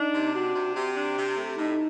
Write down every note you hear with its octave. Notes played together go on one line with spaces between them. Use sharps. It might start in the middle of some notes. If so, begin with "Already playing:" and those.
Already playing: D4 D#4
C3
D4 F#4
C3
C3 G4
D4
C3
A3
A2 D#4